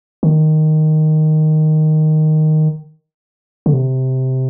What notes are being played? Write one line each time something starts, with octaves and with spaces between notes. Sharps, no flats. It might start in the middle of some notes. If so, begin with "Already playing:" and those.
D#3
D3
C3